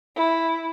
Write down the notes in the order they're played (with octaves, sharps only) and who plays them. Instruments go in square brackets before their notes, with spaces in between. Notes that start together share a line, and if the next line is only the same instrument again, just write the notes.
[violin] E4